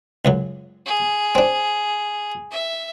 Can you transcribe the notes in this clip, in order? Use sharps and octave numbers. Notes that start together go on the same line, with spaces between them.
C#2 F#2 F#3
G#4
C4 D4
E5